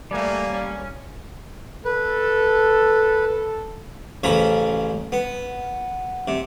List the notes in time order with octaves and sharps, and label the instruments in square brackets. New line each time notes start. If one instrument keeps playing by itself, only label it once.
[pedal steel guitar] G3 [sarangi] A3 [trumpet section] A#3 G#5 [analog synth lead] D5
[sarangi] C#4
[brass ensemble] A4 [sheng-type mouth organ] B4
[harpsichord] A1 C#3 F3 A#5 B5
B3
C3